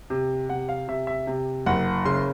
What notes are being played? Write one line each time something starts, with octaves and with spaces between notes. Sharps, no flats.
C3
C3 F#5
F5
C3 E5
E5
C3
F#1 F#5
C#3 C6